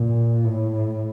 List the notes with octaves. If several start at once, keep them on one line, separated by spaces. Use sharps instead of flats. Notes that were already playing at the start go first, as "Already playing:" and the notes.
Already playing: A#2
A2